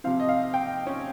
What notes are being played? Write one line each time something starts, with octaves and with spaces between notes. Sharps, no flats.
C3 F3 C4 F5
D#5
F5
G5
C#4